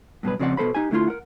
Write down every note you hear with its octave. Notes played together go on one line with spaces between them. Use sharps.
G2 B2 F#3 B4
F2 C#3 C4 F#4 D5 F#5
B2 F3 A4 C5 B5
D#4 G4 G#5
D3 A3 E4 F4 C6
A#4 F#5